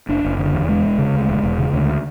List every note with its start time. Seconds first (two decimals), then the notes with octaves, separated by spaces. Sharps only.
0.09 F#1 D4
0.24 F#1
0.39 D3
0.54 E2
0.69 E1 G#3
0.83 E1
0.99 C#3
1.14 D2
1.29 E1
1.43 E1
1.59 C#3
1.73 D2